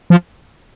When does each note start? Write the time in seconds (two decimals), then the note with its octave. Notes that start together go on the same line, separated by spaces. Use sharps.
0.10 F3